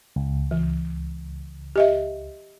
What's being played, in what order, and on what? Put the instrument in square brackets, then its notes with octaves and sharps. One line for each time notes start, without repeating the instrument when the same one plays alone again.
[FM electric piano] C#2
[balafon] E3
G4 D#5 E5